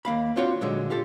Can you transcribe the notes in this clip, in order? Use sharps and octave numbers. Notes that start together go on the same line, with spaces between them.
D#2 A#3 F5 B5
C4 D4 F4 F#4 C#5
A#2 D3 F#3 G#3
F4 G4 A4